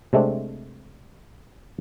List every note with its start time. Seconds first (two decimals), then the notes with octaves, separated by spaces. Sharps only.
0.13 C3 G#3 A3 C4 D4